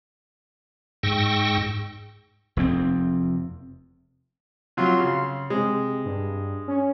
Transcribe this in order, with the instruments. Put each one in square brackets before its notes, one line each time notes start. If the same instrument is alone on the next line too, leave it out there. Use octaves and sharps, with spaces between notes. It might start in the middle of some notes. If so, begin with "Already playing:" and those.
[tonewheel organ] G#2 G5 C#6 E6 A#6
[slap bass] F1 E2 C4
[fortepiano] C3 F#3 F4 [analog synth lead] C6
[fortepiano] C#3
[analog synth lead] C3 [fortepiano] G#3
[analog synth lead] G2
C#4